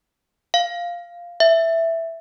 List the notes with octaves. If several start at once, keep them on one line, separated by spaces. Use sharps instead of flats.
F5
E5